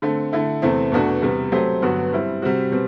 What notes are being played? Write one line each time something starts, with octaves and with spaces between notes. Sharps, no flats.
D3 A3 C4
D3 A3 E4
E2 C3 E3 A3 C4
E2 B2 A3 D4 F#4
E2 C3 G3 B3
F#3 A3 C4 G4 C5
G2 D3 F#3 B3 F#4
G3 C4 E4
C3 G3 C4 F#4
B2 G3 C4